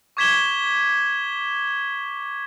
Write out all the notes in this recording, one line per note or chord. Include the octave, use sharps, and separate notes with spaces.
C#6 D6 G#6 B6 E7 G7